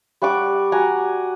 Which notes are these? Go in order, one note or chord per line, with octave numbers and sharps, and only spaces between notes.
G3 F#5 C#6 D6
F#4 F#5 G#5 A#5